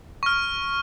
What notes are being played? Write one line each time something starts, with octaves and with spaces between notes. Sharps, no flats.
C#6 F6